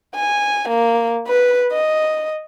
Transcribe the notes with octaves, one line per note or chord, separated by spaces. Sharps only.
G#5
A#3
B4
D#5